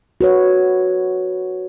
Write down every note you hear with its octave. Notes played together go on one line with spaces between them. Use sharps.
F#4 B4 C#5